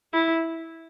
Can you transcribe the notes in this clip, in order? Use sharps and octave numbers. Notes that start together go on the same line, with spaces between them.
E4